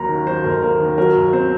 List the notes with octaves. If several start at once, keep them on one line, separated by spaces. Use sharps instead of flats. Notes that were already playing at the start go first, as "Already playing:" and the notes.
Already playing: D#2 F#3 A#3 A#5
D#3
F#3 C5
D#2 A#4
A#3 A#4
D#3
F#3 A#4
D#2
C4 C5